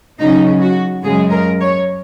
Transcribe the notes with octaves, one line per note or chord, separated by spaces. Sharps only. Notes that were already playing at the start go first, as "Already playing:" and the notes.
C#3 F#3 C#4 D#4
F#4
F#2 C#3 G#3 G#4
A#4
C#5